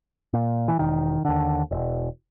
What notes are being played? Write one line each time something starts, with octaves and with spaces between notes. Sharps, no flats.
A#2
E3
E1 D#3
D#2 D3
E1